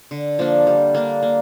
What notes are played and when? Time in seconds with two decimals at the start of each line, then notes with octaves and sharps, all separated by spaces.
0.11 D3
0.39 F3 A#3 D4
0.67 G3
0.95 A#3 D4
1.23 A#3